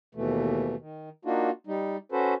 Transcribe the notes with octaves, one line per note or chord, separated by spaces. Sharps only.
D#2 B2 E3 A3
D#3
A#3 D4 D#4 F4 F#4
G3 D#4
C#4 F#4 A4 B4 C5